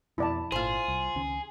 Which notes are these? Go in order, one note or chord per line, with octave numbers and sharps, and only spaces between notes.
F2 B2 E4 D5 A5
G#1 A#2 F4 G#4 C5
C2
C#2 D#3 C#4